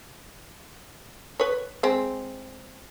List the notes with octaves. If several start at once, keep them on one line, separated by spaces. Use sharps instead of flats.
B4 C#5
G#3 C4